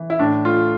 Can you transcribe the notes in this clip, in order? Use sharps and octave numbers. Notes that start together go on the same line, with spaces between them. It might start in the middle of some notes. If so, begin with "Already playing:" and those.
Already playing: E3
E4
A2 D4
A3 F4